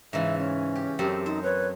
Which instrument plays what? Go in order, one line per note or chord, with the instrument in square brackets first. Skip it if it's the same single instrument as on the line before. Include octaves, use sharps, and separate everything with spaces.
[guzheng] G#2 C#3 E3 [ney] E5
[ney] C#4
[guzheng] G4
[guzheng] F#2 C4 A4 [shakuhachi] G4
[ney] D#4 [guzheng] C5
[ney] B4 [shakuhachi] C#5